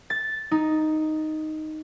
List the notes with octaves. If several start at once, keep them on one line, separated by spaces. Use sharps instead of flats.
A6
D#4